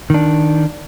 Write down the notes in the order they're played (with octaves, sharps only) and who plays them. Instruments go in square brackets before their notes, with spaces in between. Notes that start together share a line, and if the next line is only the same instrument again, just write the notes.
[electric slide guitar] D#3 D4